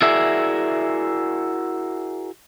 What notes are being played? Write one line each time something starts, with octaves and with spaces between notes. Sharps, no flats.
E4 F#4 G#4 A#4 D5 E5